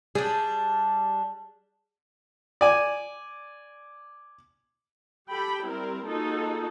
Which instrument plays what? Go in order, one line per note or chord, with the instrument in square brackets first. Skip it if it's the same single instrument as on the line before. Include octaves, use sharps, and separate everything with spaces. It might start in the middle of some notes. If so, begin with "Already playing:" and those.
[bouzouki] G3 D4 [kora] G#4
[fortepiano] D5 G#5
[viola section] G4 A4 G5 B5
G3 C4 E4 A#4
A#3 D#4 F4 F#4 G#4 A4